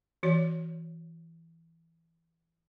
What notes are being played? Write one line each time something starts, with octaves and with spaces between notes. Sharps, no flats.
E3 F#4 C#5 D5